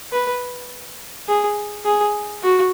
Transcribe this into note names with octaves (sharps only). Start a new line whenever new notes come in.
B4
G#4
G#4
F#4